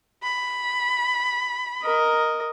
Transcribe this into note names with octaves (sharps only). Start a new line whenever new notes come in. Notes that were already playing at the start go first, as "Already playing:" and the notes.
B5
A#4 D#5